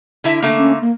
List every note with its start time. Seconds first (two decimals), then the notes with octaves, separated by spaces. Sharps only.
0.24 D3 E4 E5
0.42 D3 A3 A#3
0.58 C#4
0.81 A#3